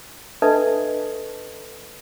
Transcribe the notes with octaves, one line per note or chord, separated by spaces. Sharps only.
D4 A4 B4 D#5 E5 A5